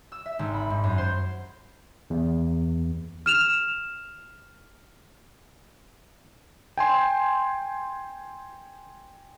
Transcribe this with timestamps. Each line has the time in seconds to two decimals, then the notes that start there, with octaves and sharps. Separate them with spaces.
0.12 E6
0.26 E5
0.39 G#1
0.54 B5
0.70 G#2
0.84 F#2
0.98 C5
2.10 E2
3.26 F6 E7 F7
6.78 G5 G#5 C6